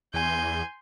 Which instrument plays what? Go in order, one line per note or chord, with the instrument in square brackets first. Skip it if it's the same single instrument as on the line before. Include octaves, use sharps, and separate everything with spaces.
[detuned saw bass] E2 [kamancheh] G#5 [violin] C6 G6